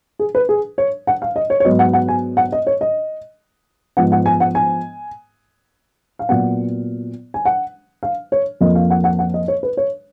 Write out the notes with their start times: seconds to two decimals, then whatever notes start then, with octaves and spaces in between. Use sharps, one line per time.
0.19 G#4
0.35 B4
0.49 G#4
0.78 C#5
1.07 F#5
1.22 F5
1.36 D#5
1.50 C#5
1.60 C#5
1.65 G#2 F#3 B3 D#5
1.79 F#5
1.93 F#5
2.08 G#5
2.37 F#5
2.52 D#5
2.67 C#5
2.81 D#5
3.97 G#2 F3 B3 F#5
4.12 F#5
4.26 G#5
4.40 F#5
4.55 G#5
6.19 F5
6.29 A#2 F#3 B3 F#5
7.34 G#5
7.45 F#5
8.03 F5
8.32 C#5
8.61 F2 F3 A#3 D#5
8.75 F5
8.90 F#5
9.04 F#5
9.19 F#5
9.34 D#5
9.48 C#5
9.63 B4
9.77 C#5